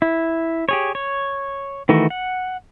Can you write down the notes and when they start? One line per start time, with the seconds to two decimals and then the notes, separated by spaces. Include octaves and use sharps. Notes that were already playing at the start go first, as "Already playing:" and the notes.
0.02 E4
0.69 G4 G#4 C#5
0.95 C#5
1.89 D#3 E3 A3 F#4
2.10 F#5